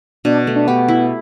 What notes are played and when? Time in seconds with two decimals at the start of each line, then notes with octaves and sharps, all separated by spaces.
0.25 B2 D4
0.47 A3
0.56 D4
0.67 B3 G4
0.88 E4